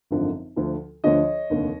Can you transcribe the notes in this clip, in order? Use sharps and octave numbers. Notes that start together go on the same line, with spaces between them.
G#1 F#2 D3 F3
D2 D3 F3
D2 D3 F3 C#5 D#5
F1 D#2 D3